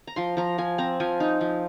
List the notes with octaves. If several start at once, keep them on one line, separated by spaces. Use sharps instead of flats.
A#5
F3 C6
F3 A#5
F3 G#5
C4 A#5
F3 G#5
D#4
F3